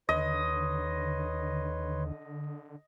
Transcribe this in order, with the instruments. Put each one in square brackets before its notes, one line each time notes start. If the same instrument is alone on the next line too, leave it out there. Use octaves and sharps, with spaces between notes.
[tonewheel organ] D#2 [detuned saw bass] D3 [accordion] B4 C#5 C6 [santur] D#5